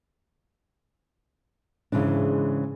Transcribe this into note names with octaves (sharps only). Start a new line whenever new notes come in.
G#2 C#3 E3 G#3 D4